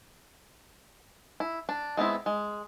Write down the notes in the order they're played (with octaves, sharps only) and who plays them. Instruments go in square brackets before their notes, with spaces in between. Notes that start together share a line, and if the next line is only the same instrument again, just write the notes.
[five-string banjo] E4
D4
G#3 B3 C4 E4
G#3